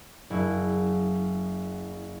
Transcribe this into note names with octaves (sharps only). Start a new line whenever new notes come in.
F#1 E4